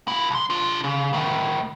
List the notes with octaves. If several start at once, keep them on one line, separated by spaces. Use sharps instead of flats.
A#2 E4
B1 C6
D4 F4
C#3
A2 D#3